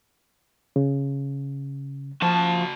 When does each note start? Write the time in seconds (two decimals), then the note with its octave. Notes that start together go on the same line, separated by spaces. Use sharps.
0.76 C#3
2.22 F3 F#4 A5